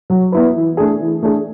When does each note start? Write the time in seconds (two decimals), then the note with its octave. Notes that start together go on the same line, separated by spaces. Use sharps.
0.10 F#3
0.32 B3 E4 B4
0.55 E3
0.77 A3 D4 G#4
1.00 E3
1.23 A3 D4 G#4